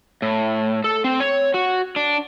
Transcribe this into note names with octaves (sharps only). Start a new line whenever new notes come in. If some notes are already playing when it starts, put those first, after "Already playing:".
A2
A4
C4
C#5
F#4
D4